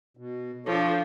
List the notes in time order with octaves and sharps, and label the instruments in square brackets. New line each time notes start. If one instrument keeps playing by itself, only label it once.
[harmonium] B2
[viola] F3 D4 [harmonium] A4 C#5